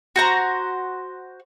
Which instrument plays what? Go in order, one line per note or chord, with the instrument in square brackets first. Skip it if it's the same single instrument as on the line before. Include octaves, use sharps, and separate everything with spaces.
[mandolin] F#4 C5 A#5